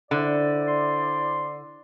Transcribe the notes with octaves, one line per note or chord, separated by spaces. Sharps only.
D3 E4 C5 D5
C6